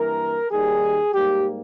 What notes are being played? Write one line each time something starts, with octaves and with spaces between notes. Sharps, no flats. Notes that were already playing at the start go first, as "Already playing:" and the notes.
Already playing: G2 E3 A#3 A#4
D#2 D#3 G3 G#4
G#2 G3 A#3 G4